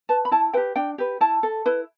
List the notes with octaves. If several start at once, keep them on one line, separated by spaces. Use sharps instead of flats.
B4 A5
B5
E4 A5
G4 B4 G5
D4 G5
G4 B4
E4 A5
A4
E4 B4